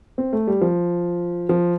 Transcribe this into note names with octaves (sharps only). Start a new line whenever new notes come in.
C4
A3
G3
F3
F3